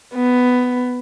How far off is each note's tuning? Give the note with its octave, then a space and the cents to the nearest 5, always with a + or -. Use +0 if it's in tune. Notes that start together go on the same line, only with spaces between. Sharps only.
B3 +10